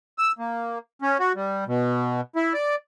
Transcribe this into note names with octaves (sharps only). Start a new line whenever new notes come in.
E6
A#3
C#4
F#4
G3
B2
E4
D5